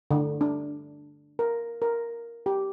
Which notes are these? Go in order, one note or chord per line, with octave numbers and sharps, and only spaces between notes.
D3
D4
A#4
A#4
G4